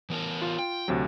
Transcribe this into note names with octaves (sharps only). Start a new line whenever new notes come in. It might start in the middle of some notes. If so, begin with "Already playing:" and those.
E3 B3 A#4
F4
G5
D2 C3 F#3